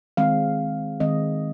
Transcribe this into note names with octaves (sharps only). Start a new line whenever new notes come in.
D#3 G#3 C4 F5
D#3 G#3 C4 D#5